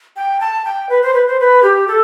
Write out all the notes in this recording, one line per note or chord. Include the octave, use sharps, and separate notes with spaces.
G5
A5
G5
B4
C5
B4
C5
B4
G4
A4